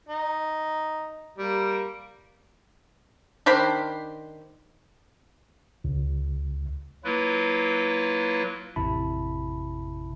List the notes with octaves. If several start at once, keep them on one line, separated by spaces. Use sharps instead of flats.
D#4
G3 A#3
D#3 D4 C5 B5
C#2
F#3 A#3 E4 F4 B4
A1 F2 C3 E4 A5 B5